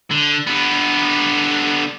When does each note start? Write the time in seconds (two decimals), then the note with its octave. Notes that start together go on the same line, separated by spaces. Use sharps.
0.11 D3
0.47 D3 B3